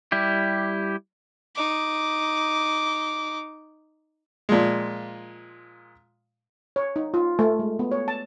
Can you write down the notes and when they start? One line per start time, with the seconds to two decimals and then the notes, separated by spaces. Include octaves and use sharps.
0.12 G3 E4 G4
1.55 D#4 D6
4.49 A#2 F3 G#3
6.76 C#5
6.96 D#4
7.14 F4
7.39 A3
7.59 G#3
7.79 B3
7.92 C#5
8.08 A5